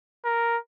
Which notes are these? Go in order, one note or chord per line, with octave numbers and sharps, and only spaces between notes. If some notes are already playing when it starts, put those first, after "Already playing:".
A#4